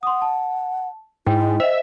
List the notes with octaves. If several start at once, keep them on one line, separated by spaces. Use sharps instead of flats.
F#5 C6 D#6
A5
G#2 E4 G5
C5 D#5 E5 F#5